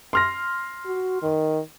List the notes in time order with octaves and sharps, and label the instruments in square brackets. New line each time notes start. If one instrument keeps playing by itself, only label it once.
[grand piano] C6 F6 A#6
[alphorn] F#4
D#3